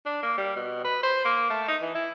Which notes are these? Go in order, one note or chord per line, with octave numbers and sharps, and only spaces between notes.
D4
A#3
G3
B2
B4
C5
A#3
A3
D#4
E3
E4